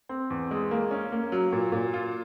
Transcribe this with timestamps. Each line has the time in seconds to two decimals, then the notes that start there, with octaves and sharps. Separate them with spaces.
0.09 C4
0.30 E2
0.51 G#3
0.71 A#3
0.91 C#4
1.12 A#3
1.32 F#3
1.52 A#2
1.72 A#2
1.93 F4